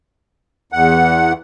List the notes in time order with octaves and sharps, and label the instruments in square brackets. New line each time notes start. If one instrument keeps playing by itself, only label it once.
[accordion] E2 F#5